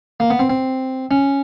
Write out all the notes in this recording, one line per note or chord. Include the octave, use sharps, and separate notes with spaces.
A#3
B3
C4
C4
C#4